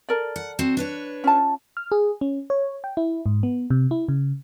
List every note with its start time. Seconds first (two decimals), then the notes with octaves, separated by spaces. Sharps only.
0.09 A4 A#4 D5
0.36 F#5
0.59 C4 F#4
0.77 D4 B4 C#5
1.24 C#4 F4 A5
1.77 F6
1.92 G#4
2.21 C#4
2.50 C#5
2.84 G5
2.97 E4
3.26 G#2
3.43 B3
3.70 C3
3.91 E4
4.08 C#3